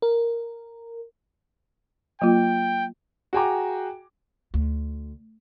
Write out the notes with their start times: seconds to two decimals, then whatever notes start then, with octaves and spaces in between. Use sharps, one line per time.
0.02 A#4
2.22 F#3 A#3 F4 G5
3.33 F#4 G#4 G5 G#5 A#5 D6
4.54 D2